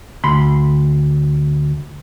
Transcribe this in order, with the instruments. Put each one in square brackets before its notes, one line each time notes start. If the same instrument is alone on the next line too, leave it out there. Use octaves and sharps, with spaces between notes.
[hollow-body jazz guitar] D2 B5 C6